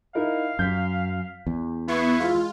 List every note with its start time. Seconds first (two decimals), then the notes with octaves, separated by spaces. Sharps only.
0.15 D#4 E4 A#4 F5
0.59 F#2 G6 B6
1.46 E2
1.88 B3 E4 C#6 C7
2.20 G#3 F4